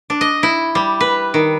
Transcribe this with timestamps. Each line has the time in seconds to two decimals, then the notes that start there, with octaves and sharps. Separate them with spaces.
0.10 D4
0.21 D#5
0.43 E4
0.75 G3
1.00 B4
1.34 D#3